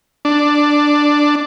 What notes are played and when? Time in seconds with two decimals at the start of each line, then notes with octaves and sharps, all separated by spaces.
0.25 D4